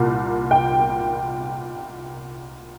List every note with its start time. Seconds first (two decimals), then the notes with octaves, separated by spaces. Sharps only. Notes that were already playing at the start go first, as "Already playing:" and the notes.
Already playing: C2 A#2
0.51 G5